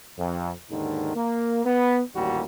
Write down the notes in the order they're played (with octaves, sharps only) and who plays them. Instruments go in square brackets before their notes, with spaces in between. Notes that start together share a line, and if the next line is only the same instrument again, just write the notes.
[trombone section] F2
D#2 G#2 D3 D#3
A#3
B3
A1 D#2 A#2 G3 F#4